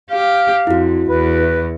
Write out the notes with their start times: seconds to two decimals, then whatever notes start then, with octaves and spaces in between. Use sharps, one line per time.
0.11 G4 F5
0.67 F2 E4 F#4
1.10 E2 B4